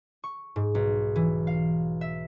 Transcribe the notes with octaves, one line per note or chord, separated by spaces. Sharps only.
C#6
G#2
B1
E3
F5
E5